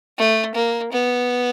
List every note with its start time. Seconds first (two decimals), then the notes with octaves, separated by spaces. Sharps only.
0.18 A3
0.55 A#3
0.92 B3